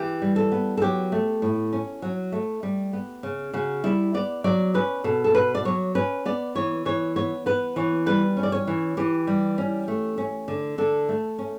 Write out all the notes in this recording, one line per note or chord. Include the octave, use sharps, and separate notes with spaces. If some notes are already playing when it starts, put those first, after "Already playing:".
Already playing: E3 G4
G3
A4
B3
A4
F#3 G4
A3
A2
C#4
F#3
A3
G3
B3
C#3
C#3 F#4
G3 E4
B3 D5
F#3 D5
C#4 B4
B2 A4
A4
B2 B4
D5
F#3 C#5
C#4 B4
B3 D5
E3 C#5
E3 C#5
B3 C#5
B3 B4
E3 C#5
G3 B4
C#4
D5
C#5
E3
E3 G4
G3
C#4
A3
C#4
D3
D3 A4
A3
C#4